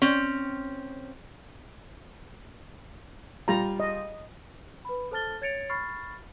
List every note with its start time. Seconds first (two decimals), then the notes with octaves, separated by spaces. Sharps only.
0.02 C4 C#4
3.48 G3 F4 A#5
3.80 D#5
4.85 B4 B5
5.11 A4 C5 A5 F6 A6 G7
5.41 C#5 G#6 A6 C#7 D7 F7
5.69 B5 C#6 F6 A6 C7